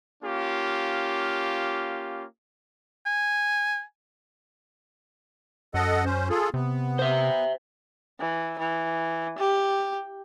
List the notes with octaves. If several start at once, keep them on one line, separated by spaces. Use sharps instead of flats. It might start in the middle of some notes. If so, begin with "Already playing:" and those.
A#3 C#4 F4 G4
G#5
F#2 A4 D#5 F#5
C#4 C5
F4 G#4 A4
C3 B3
C5 E5
E3
E3
G4